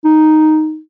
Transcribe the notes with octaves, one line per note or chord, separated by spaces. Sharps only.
D#4